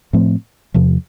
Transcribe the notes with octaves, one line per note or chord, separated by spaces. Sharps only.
A2 F3 A3 C4
E2 C3 F3